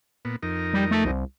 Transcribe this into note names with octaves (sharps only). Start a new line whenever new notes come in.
A#2 B3
F2 D#4 A#4
G3
A3
C2